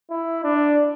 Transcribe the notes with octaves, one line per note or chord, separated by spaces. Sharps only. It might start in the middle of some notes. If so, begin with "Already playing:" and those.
E4
D4